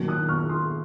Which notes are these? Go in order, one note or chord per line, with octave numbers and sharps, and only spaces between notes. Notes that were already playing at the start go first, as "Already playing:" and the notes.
Already playing: D#3 F#3 A#3
D#6 F#6
C#6 F6
C6 D#6